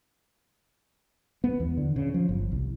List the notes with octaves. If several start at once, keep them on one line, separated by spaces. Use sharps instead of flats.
B3
E2
D3
C#3
F3
G1
C2